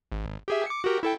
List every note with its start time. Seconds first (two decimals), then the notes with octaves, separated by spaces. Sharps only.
0.12 G#1
0.48 G4 G#4 E5
0.66 D6 C#7
0.84 F#4 G4 A#4
1.03 E4 A4 G5